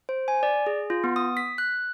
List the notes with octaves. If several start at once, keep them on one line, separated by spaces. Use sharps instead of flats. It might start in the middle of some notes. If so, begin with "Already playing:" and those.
C5
G#5
D5
G#4
F4
B3
D#6
B6
F#6